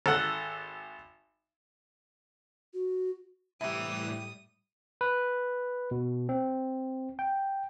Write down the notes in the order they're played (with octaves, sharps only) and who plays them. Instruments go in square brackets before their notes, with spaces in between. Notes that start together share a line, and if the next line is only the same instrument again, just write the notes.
[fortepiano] G#1 A4 F#5
[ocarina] F#4
[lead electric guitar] C2 E3 [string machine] A2 G3 [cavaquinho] E4 G4 [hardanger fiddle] D#6
[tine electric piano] B4
B2
C4
G5